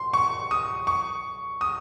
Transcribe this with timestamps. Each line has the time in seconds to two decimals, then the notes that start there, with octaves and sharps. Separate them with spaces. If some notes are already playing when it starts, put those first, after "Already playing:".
Already playing: C6
0.13 C#6
0.51 D#6
0.87 C#6
1.61 D#6